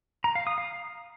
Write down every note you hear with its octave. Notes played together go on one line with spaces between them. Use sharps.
A#5
F5
D#6
F5